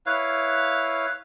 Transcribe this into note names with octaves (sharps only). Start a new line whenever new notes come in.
E4 B4 C#5 F5